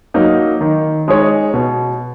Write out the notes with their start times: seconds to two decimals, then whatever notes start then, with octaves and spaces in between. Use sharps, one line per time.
0.14 F#3 A#3 D#4
0.61 D#3
1.08 G#3 D#4 G#4 C#5
1.54 B2